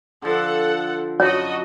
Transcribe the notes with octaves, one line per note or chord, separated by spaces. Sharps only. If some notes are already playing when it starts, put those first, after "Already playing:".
D3 F3 A4 F#5
F#2 F#4 C#5 D#5 A5 B5